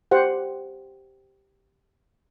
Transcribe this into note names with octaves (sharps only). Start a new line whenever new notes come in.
G4 C5 F#5